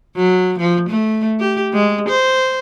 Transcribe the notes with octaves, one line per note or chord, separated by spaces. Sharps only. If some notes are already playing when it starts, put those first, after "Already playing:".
F#3
F3
A3
G4
G#3
C5